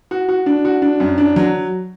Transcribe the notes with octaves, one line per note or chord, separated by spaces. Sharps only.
F#4
F#4
D4
F#4
D4
F#2
D4
F#3